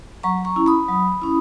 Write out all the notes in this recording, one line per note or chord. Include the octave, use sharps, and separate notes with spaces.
F#3 A#5 C#6
A#5 C#6
C#4 E4
B5 D#6
F#3
C#4 E4